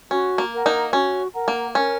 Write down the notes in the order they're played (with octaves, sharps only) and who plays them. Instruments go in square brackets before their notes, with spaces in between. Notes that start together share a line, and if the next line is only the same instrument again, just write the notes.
[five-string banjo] C#4 [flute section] F#4
[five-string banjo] A#3
[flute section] A#4 F#5 A#5
[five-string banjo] A#3 D#4
[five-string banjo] C#4 [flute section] F#4
[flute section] A#4 F#5 A#5
[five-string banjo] A#3
[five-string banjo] C#4 [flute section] A#4